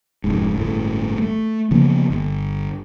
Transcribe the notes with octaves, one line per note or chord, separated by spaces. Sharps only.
F1 G#2
G1 A2
A3
C#3 F3 A#3 B3
G1